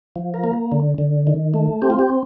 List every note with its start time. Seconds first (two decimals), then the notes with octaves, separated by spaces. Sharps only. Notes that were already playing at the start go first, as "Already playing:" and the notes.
0.16 F3
0.34 A#4
0.44 A#3
0.72 D3
0.98 D3
1.27 D#3
1.54 A3
1.82 C4 G4
1.90 F4
1.99 G4